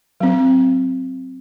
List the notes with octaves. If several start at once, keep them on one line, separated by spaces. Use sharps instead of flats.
F#3 C4